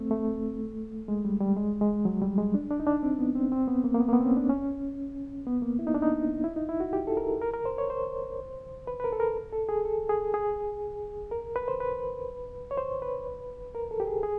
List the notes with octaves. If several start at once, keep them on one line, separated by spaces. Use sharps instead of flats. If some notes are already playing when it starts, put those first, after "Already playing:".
Already playing: A3 C4
A3
G#3
G3
G3
G#3
G#3
F#3
G3
G#3
D4
D4
D#4
D4
C4
B3
C4
C4
B3
A#3
A#3
B3
A#3
B3
C4
C#4
D4
C#4
B3
A#3
E4
D#4
D4
D#4
E4
D#4
E4
F#4
G4
A4
A#4
A#4
A#4
C5
C#5
C5
B4
B4
A#4
A4
A#4
A4
G#4
A4
G#4
G#4
A#4
B4
C5
B4
C#5
C5
B4
A#4
A4
G4
G#4
G#4